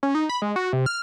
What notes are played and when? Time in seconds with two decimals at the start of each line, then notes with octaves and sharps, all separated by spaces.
0.03 C#4
0.15 D#4
0.29 B5
0.42 G#3
0.56 F#4
0.73 C3
0.86 F6